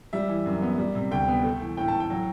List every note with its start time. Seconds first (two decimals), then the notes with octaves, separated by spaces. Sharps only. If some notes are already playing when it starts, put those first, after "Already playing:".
0.13 G3 E5
0.29 E3
0.46 F#2
0.62 B3
0.78 G3
0.95 C3
1.11 D2 G5
1.28 B3
1.44 A3
1.61 E3
1.77 A2 G5
1.88 A5
1.94 A2
2.00 G5
2.10 F#3